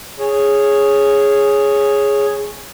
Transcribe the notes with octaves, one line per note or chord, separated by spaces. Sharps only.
G#4 C#5